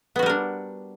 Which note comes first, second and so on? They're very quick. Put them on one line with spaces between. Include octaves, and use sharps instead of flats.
B3 F#4 G3 A#4 D4